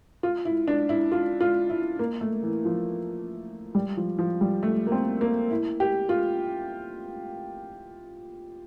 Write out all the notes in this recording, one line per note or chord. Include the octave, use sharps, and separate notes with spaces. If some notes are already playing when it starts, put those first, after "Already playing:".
F4
E4
D4
E4
F4
F4
E4
A#3
A3
E3
F3
G3
F3
F3
G3
A3
A#3
C4
A#3
E4
G4
F4